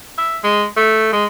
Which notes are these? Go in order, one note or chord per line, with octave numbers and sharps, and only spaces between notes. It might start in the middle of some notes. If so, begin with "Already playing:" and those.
E5
G#3
A3
G#3